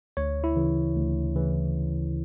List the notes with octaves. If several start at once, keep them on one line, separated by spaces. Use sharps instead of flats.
D2 C#5
E4
C#3 E3
D2
C#3 E3